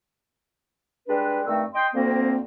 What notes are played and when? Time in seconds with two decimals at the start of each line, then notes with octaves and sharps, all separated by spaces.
1.08 G3 G#3 D4 B4
1.47 G2 D#3 A3 C4 E5 E6
1.74 D#5 G5 C6
1.94 D2 A#3 C4